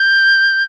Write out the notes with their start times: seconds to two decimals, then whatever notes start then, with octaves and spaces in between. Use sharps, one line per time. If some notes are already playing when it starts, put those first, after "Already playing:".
Already playing: G6